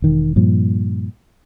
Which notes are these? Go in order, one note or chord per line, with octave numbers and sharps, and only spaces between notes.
E1 D#3
G2 A#2 F3